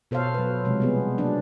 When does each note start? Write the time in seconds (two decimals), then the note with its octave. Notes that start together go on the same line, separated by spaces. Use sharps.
0.11 B2 A4 C5 C#5 F5
0.34 F#3 B4
0.65 C3 F3 G#3
0.80 G3 B3 G#4
1.18 F#3 A#3 D4